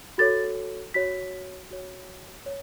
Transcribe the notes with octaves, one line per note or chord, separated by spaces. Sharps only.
F#4 A4 C#5 A6
F#4 C#5 B6
F#4 C#5
C#5